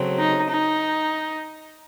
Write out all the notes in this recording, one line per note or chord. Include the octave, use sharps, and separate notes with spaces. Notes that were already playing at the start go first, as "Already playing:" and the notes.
Already playing: C#3 F#3 A3 C4
D#4
D#4